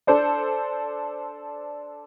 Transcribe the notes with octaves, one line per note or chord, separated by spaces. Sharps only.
D4 A4 C5 D5